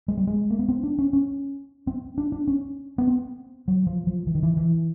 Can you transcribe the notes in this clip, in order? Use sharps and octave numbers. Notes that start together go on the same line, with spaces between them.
G#3
G3
G#3
A#3
B3
C4
D4
C#4
C#4
C4
D4
D4
C#4
B3
C4
F#3
F3
F3
E3
D#3
E3
E3